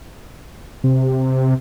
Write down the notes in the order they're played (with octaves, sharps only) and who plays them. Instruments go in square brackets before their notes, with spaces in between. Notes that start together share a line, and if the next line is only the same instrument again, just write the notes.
[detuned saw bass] C3